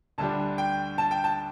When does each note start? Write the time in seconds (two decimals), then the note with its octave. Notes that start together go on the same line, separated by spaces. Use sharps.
0.18 D2 D3 G3 D4 A5
0.58 G5
0.98 A5
1.11 G5
1.24 A5